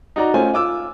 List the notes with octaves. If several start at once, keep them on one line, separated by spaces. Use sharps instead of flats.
D#4 F#4 D5 A#5
A3 C#4 F4 C5 G#5
F4 D6 E6